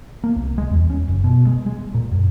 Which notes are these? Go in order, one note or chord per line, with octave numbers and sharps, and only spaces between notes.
A#3
C2
G#3
E2
C#4
F#1
B2
G#3
G#3
A#2
F#2